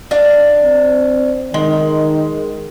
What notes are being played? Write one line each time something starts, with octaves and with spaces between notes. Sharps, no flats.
D4 F5
C4
D#3 G#3